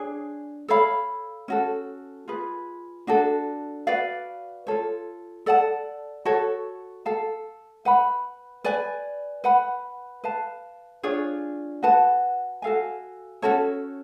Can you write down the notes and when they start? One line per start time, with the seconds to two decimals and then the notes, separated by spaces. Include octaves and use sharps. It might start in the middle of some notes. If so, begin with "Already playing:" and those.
Already playing: D4 G#4 C#5 G#5
0.68 A4 C#5 F5 B5
1.48 C#4 F#4 A4
2.28 F4 G#4 B4
3.07 D4 F#4 A4
3.87 F#4 B4 D5 F5
4.67 F4 A4 C#5
5.46 A4 D5 F#5 A5
6.25 F#4 A4 C#5
7.05 A4 F5 A5
7.85 B4 F#5 B5
8.64 B4 D5 G#5
9.44 B4 F#5 B5
10.24 B4 F5 A5
11.03 D4 F4 G#4 C#5
11.83 F#4 B4 F#5 A5
12.62 F#4 A4 F5 G#5
13.42 C#4 F#4 A4 C#5